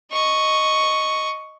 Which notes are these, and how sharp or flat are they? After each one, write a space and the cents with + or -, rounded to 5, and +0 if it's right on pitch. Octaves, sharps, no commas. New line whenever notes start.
D#5 +0 C#6 +0